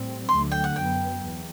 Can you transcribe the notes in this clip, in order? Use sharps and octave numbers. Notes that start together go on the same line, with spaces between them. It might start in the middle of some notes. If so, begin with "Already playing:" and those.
Already playing: A2 G3 C4
D2 D3 F#3 A3 C6
G5
F#5
F#2 F#3 B3 G5
E2